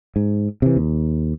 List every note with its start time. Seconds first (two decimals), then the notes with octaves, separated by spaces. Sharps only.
0.16 G#2
0.62 C3 E3
0.77 D#2